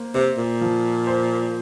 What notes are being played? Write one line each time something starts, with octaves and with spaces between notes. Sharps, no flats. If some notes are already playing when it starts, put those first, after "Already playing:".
Already playing: A#3 C5
C3 C5
A#2
F3
C5